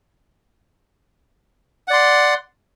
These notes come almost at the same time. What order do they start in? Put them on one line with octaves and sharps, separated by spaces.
F#5 D5 C6